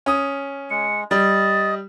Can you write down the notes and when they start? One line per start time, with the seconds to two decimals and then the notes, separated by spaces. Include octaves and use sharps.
0.06 C#4 D#6
0.70 G#3 C#7
1.11 G3 D#5 A6